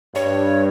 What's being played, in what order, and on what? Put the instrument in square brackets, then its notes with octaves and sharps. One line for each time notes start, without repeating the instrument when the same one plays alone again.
[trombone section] G2 [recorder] C#5